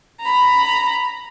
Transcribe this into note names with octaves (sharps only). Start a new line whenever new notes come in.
A#5 B5